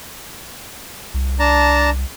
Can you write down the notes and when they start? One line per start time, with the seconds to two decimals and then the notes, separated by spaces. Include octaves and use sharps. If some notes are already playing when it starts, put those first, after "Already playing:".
1.14 C2
1.40 D4 A5 A#5